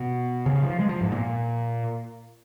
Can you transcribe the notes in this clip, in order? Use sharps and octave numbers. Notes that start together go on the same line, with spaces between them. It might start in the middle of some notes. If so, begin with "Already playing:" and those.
Already playing: B2
C#3
F3
G#3
F3
G#2
A#2